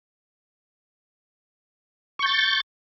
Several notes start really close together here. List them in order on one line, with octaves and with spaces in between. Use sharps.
C#6 G6 A6